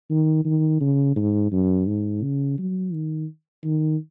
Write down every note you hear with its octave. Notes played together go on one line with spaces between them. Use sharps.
D#3
D#3
C#3
G#2
F#2
G#2
C#3
F#3
D#3
D#3